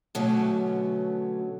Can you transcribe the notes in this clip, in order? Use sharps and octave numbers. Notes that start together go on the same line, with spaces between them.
B2 D3 F#3 A3 B3 C#4